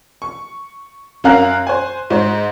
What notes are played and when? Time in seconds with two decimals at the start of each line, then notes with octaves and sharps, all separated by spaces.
0.22 C#6
1.24 F#2 C#4 A#4 F5 A#5 F#6
1.67 C5 G#5
2.10 G#2 C5